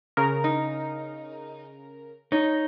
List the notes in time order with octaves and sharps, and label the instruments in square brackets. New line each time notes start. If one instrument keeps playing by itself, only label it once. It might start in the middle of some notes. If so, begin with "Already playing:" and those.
[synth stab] C#3 A#4 A#5
[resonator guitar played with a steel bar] D#4
[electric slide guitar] D#4 [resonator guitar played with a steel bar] C#5